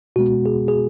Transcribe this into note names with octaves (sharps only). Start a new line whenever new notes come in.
B2 G#3 B3 F#4
G#4
G#4